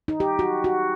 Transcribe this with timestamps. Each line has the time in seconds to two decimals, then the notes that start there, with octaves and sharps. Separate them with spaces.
0.08 D#4
0.20 G4
0.39 F#4
0.64 F#4